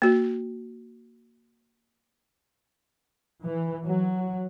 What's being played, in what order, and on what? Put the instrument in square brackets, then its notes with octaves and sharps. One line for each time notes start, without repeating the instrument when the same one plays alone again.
[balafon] A#3 F#4
[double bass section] E3
F#3